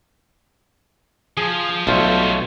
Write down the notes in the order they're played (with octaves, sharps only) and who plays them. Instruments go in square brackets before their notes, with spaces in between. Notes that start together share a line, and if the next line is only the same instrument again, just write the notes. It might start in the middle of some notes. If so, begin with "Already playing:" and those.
[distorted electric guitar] F3 [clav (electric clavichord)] G#4
[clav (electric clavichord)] B1 A3 F4 [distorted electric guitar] G3 C#5